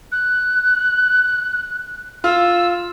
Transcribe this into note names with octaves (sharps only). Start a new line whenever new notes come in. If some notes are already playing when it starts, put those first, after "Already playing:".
F#6
F4 E6